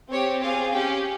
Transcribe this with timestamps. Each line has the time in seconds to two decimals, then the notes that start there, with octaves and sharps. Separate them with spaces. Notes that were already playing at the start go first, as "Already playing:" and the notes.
0.11 C4 G4 C#5
0.42 C4 F4 G#4 F5
0.72 C#4 G4 G5